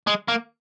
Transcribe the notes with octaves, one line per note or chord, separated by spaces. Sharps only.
G#3
A#3